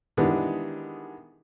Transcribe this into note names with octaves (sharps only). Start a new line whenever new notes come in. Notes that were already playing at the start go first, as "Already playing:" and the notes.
D#3 E3 G3 G#3 B3 D4